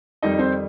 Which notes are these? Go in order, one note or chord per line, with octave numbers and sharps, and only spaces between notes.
F2 D#3 G3 D#4 D#5
C4 C5